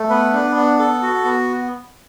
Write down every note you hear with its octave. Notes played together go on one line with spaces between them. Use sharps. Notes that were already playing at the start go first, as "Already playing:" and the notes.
Already playing: A3
B3 B4
D4
B3
A4
F#4
B3